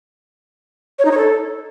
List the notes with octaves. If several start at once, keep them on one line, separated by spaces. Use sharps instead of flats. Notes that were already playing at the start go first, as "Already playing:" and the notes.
C#5
D#4
C#5
A4